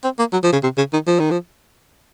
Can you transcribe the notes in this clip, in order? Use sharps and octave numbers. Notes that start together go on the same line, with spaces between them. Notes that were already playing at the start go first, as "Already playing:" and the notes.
C4
A#3
F#3
F3
C#3
C3
C#3
D#3
F3
D#3
F3